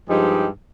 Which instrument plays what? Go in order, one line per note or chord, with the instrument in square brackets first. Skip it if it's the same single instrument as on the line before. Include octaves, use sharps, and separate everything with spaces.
[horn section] G2 F3 G#3 D#4 G4